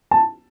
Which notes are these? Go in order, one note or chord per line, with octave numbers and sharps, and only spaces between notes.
A5